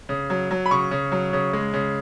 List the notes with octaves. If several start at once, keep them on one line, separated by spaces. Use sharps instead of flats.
C#3
F#3
F#3
B5
C#3 C#6
C#3
F#3
C#3
G#3
C#3